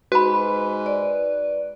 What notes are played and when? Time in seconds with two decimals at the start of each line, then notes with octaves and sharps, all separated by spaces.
0.12 G#2 F#4 B4 B5
0.86 D5